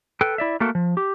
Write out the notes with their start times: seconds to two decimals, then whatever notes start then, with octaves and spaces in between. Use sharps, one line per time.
0.21 A4 B4 G5
0.38 E4 D5 E5
0.60 A3 A#3 F#4 A4 A#4
0.75 F3
0.97 G4